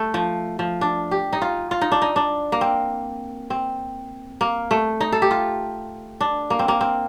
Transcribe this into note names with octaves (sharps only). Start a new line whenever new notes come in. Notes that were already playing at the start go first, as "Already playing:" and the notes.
Already playing: A3
F3
F3
D4
G4
D#4
F4
F4
D#4
D4
D#4
D4
A#3
C4
C4
A#3
A3
D#4
A4
G4
F4
D4
A#3
C4
A#3
C4